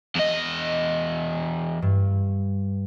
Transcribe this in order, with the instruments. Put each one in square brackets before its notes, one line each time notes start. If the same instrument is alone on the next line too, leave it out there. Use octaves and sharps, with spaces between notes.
[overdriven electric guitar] E2 D#5
[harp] G2